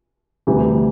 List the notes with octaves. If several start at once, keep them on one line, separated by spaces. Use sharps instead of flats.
D2 C3 E3 G3